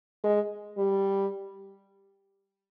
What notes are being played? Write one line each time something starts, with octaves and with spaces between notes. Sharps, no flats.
G#3
G3